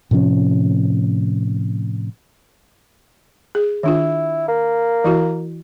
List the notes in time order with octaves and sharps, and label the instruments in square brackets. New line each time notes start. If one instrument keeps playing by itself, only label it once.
[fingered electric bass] A2 C3 F3 C#4
[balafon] G#4
[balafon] D#3 D4 F4 [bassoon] E4
[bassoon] A#3
[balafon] E3 E4 F#4